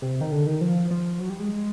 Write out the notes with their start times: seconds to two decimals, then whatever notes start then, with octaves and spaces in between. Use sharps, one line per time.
0.02 C3
0.21 D#3
0.32 D3
0.47 D#3
0.61 F3
0.91 F3
1.20 F#3
1.30 G3
1.40 G#3